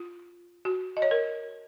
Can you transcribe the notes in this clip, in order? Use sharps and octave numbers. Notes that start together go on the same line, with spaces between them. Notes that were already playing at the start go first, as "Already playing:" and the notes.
Already playing: F4
F#4
D#5
C#5
A#4